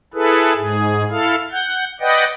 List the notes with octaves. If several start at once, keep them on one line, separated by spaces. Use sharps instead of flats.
E4 G#4 A4 B4
G#2 G#4
E4 A4 F5
F#5 G6
B4 D5 D#5 F#5 G5